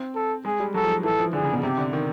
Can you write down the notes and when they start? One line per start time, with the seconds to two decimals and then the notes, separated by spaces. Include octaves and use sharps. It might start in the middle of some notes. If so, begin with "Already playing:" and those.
Already playing: C4
0.15 A4
0.45 G#3 G#4
0.60 G3
0.74 F#3 A4
0.84 F3
1.03 E3 A4
1.18 F3
1.33 D3 G#4
1.44 C#3
1.53 B2
1.63 C3 G4
1.78 D3
1.93 D#3